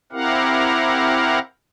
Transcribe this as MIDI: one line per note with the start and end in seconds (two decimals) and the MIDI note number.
0.12 1.39 60
0.12 1.39 64
0.12 1.39 67
0.12 1.39 70
0.12 1.39 77
0.12 1.39 78